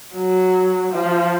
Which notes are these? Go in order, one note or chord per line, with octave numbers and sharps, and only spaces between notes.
F#3
F3